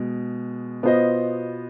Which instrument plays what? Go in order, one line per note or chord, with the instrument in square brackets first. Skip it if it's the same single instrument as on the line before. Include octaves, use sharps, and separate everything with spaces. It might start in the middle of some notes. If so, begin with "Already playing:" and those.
Already playing: [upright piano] B2 G#3
B2 B3 F4 C5 D#5